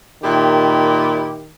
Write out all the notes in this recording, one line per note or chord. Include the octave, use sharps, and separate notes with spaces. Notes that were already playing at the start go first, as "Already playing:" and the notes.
A#2 D#3 E4 G4